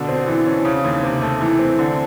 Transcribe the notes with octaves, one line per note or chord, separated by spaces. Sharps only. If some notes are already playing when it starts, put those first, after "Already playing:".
Already playing: B2 D3
C4
E3
C#4
C#3
D#2
C3
A3
E3
C4
D3